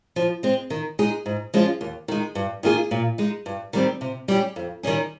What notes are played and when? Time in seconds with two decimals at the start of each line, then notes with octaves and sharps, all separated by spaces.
0.16 F3
0.43 G#3 C4
0.70 D#3
0.99 G#3 D#4 G#4
1.26 G#2
1.54 F3 G#3 C#4 F4
1.81 D#2
2.08 D#3 G#3
2.35 G2
2.63 D#3 A#3 F4 G#4
2.91 A#2
3.18 G#3 D#4
3.46 G2
3.73 D#3 G3 C4
4.01 C3
4.28 G3 C#4 G4
4.56 F2
4.83 D#3 G3 C#4 G#4